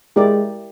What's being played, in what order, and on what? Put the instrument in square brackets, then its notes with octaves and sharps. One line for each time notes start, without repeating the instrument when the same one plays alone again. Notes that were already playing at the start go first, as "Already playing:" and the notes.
[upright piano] G#3 [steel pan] E4 G4 A#4 D5